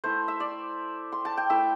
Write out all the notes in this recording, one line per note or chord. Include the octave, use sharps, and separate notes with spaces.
A3 E4 C5
E5
D5
C6
A5
G5
A3 E4 E5